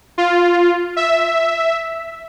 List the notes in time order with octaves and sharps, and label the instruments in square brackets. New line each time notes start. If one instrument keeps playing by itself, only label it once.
[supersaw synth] F4
E5